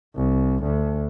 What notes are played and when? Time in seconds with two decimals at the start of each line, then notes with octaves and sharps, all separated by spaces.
0.16 C2
0.63 D2